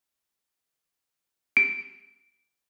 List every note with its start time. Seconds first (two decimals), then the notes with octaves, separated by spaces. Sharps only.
1.57 D7